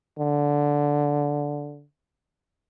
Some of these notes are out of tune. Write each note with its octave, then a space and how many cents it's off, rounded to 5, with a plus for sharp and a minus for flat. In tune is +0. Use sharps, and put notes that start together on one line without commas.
D3 -10